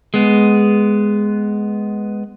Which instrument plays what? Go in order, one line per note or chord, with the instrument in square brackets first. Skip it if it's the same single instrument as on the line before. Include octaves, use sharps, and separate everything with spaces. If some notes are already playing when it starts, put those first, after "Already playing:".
[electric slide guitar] G#3 B3